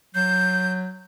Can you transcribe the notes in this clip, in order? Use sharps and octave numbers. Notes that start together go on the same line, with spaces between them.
F#3 G6